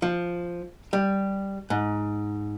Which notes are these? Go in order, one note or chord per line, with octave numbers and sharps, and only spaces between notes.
F3
G3
G#2